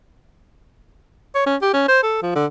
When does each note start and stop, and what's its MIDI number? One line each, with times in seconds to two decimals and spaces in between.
1.35 1.46 73
1.46 1.56 61
1.62 1.73 67
1.73 1.85 61
1.88 2.00 72
2.03 2.19 69
2.22 2.35 53
2.35 2.46 50